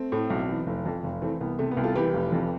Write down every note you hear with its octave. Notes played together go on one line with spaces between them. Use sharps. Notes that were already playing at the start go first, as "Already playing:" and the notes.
Already playing: A3 C4
A2
B1
E3
F1
F2
F1
E3 A3 C4
C2 B3
C3 A3
B3
C2
F4 A4
E3 G4 B4
F1
F2